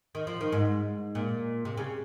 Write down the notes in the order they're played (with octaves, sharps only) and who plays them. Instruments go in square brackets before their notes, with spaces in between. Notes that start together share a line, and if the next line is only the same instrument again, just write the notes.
[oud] D#3
F3
D#3
G#2
A#2
C3
C#3